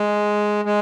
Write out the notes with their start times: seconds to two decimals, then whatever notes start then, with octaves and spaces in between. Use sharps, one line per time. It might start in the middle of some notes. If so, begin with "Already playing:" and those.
Already playing: G#3
0.65 G#3